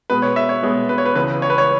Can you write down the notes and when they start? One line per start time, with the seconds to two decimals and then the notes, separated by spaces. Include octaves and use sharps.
0.10 B2 G#3 B3 B4
0.22 C#5
0.36 E5
0.49 C#5
0.63 B2 G#3 B3
0.89 B4
0.98 C#5
1.06 B4
1.16 C#2 C#3 E3 B4
1.42 C#5
1.50 B4
1.58 C#5